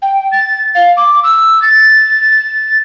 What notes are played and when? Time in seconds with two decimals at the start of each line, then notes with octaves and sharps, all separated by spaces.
0.02 G5
0.31 A6
0.74 F5
0.96 D6
1.23 E6
1.62 A6